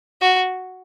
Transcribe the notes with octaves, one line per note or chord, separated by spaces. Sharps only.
F#4